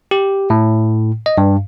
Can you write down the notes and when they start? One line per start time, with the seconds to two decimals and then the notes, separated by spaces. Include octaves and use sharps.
0.11 G4
0.50 A2
1.26 D#5
1.38 G2